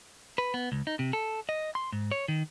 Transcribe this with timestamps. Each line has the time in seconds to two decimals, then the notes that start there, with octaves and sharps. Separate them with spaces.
0.38 B4
0.54 B3
0.72 C#2
0.87 D#4
0.99 C3
1.13 A4
1.49 D#5
1.75 C6
1.93 G#2
2.12 C#5
2.28 D#3